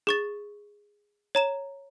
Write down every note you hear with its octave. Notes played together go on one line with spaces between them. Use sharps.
G#4 C#6 A6
C#5 A#5 E7